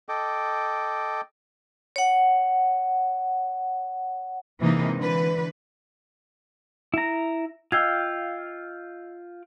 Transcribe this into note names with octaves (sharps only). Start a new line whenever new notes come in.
A4 D#5 G5 D6
C#5 F#5
C3 E3 G#3 A#3 D#4
D3 E3 B4
E4 A#5
F4 D#5 F5 G5 E6 G#6